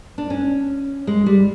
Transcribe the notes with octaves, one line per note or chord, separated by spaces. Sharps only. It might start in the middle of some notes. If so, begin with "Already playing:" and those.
D4
C#4
G#3
G3